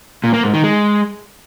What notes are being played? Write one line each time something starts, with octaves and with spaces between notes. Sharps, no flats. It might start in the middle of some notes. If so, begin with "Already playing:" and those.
A#2
A#3
G#2
D#3
G#3